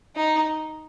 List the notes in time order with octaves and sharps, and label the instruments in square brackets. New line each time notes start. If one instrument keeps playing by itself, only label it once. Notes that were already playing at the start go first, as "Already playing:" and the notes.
[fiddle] D#4